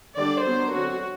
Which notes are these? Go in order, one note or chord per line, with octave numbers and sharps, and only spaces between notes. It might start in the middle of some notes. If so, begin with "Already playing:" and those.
D3 G3 D4 D5
F#3 B3 D4 C5
D3 F#3 C4 F#4